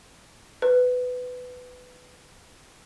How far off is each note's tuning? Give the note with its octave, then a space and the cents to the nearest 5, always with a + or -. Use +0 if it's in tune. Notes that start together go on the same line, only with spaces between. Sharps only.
B4 +15